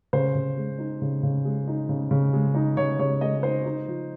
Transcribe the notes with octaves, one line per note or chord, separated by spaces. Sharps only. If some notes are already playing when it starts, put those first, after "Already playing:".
C#3 C5
C#3
G#3
D#4
C#3
C#3
G#3
D#4
C#3
C#3
G#3
D#4
C#3 C#5
C#3 C#5
G#3 D#5
D#4 C5
D#4
F3